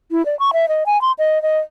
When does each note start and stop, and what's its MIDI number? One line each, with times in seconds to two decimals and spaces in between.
0.11 0.24 64
0.25 0.38 74
0.39 0.51 85
0.53 0.68 76
0.68 0.84 75
0.86 1.00 80
1.01 1.12 84
1.18 1.41 75
1.42 1.59 75